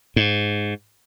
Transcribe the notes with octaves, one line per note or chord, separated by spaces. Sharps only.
G#2